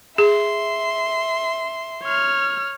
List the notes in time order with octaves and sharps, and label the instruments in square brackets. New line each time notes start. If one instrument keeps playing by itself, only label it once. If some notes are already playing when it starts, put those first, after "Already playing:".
[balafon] G#4 [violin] E5 C6
[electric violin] C#5 F6